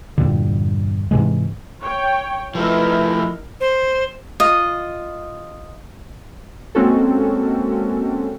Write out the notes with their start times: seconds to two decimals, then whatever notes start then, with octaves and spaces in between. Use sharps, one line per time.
0.18 E2 G2 A#2 D3
1.11 G#2 C3 E3 G#3
1.82 C#5 G5
2.55 F3 A3 D#4 E4 A#4 B4 E5
3.61 C5
4.40 F4 D#5
6.75 G#3 A#3 C4 C#4 F#4 A4